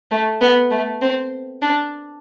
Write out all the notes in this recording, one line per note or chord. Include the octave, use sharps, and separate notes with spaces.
A3
B3
A3
C4
D4